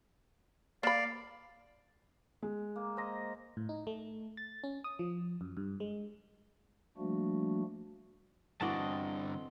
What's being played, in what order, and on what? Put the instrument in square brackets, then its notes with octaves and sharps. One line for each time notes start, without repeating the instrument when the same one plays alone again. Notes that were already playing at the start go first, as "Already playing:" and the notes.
[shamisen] A#3 B5 [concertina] D5 F5
[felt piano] G#3
[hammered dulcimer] A#3
C5 D#5 A#5
[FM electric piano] A2
D#4
A3
A6
C#4
D#6
F3
F#2
G2
G#3
[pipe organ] F3 G3 A3 A#3 D4 F#4
[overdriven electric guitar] G2 D3 [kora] E3 F#4 D5 [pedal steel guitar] C4 D#5 A5